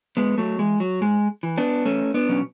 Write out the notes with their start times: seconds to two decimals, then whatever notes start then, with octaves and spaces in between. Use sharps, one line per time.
0.17 G#2 G#3 B3
0.38 F#3 A3
0.59 E3 G#3
0.80 F#3
1.01 G#2 G#3
1.43 E3
1.58 B3 D4
1.85 E2 A3 C#4
2.14 B3 D4
2.28 B2 F#3 C#4